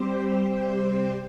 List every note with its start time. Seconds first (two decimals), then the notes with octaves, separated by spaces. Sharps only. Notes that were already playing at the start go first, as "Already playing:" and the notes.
Already playing: G3 C4 G4 C5
0.47 C3 G3 C4 G4 C5